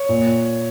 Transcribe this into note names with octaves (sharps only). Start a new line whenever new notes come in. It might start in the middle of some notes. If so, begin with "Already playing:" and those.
Already playing: C#5
A#2